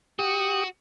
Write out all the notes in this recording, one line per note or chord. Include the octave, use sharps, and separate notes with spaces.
F#4 G4 D#6